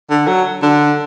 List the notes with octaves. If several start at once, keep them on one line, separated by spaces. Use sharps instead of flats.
D3
F#3
D3